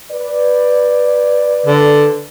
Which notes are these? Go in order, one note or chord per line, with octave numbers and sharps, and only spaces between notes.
B4 D5
D3